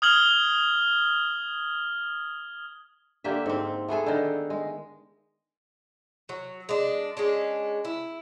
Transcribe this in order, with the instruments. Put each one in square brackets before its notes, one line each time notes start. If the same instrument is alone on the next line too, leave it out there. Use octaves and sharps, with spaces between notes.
[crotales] D#6 F6 G#6 F#7 G7
[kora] D3 A#3 G4 E5
G#2 C4
A3 B3 G#4 A4
D3 D#3
G#3
[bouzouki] F#3
G#3 D4
G#3 C#4 D4
E4